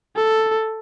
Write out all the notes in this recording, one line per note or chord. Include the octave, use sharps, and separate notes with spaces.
A4